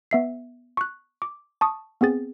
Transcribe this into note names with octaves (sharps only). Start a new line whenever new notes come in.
B3 E5 C7
C#6 F#6
D6
A5 C#6 D#6
B3 C4 G#4 A6